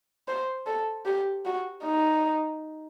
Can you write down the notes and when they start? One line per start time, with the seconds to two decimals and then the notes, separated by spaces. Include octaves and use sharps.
0.28 C5
0.66 A4
1.05 G4
1.45 F#4
1.84 D#4